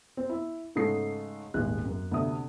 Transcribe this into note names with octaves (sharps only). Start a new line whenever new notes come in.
C4
E4
G#2 C#3 A3 D#6 C7
D#1 G#1 G#3 F#6
F#2
D2 C3 E5 D#6